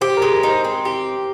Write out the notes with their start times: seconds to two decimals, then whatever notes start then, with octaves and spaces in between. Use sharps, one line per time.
0.01 G4 C5
0.17 A#4
0.22 G#3
0.33 A#4
0.43 D#4 C5
0.64 C4
0.85 G4